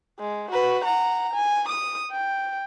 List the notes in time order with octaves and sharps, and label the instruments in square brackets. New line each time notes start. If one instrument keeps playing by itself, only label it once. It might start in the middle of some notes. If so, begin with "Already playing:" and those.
[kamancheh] G#3
F#4 B4
F#5 A#5
G#5
D#6
G5